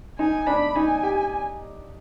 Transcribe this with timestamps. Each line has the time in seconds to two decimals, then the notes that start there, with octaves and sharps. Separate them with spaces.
0.19 D#4 G#5
0.47 D4 B5
0.76 D#4 G#5
1.03 G4